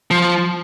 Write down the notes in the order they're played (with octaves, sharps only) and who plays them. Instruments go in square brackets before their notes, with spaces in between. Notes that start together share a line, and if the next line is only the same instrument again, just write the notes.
[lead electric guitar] F3